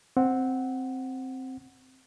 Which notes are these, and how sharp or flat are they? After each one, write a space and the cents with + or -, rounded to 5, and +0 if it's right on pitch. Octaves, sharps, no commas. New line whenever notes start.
C4 +0 F#5 +0